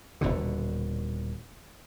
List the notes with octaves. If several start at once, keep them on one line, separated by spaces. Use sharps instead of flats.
D#1 A#1 B2 D3